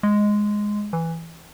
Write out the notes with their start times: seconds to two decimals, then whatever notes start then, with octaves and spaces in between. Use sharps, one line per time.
0.03 G#3
0.93 E3